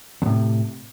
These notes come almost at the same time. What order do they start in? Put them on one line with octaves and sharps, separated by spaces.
E2 A2 C3